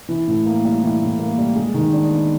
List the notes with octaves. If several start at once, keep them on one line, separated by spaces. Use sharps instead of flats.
E3
A2
A#3
G3
E3
A2
A#3
G3
G#3
D#3
D4
B3